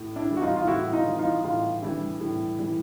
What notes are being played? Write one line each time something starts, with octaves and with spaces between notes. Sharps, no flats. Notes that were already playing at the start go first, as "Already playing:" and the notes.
Already playing: A2
D4 E4
E3 G3
F#4
D#4 F4
F4
A2 E4 F#4
D#4 F4
E3 G3
D#4 F4
A2 D#4 F4
E3 G3 D4 E4
A2
E3 G3